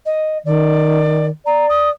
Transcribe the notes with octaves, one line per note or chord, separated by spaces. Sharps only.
D#5
D#3 D5
D5 A#5
D#6